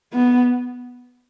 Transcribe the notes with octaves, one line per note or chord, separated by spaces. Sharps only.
B3